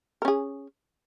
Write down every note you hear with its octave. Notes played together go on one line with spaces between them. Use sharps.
C#4 G#4 A#4